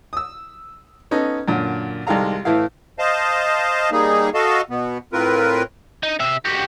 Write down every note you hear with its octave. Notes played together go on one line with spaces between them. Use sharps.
D#6 E6
B3 C#4 D#4 A4
F#2 A#2 D3
C2 D#3 G#3 A4 F5 A#5
A2 E3 A3 E4 F5
C5 D#5 F5 A5
G3 A#3 D#4 G#4
F#4 A4 D#5 F5 A5
B2 B3
A2 C4 F4 A#4 B4
D#4
C3 E5
F#4 G4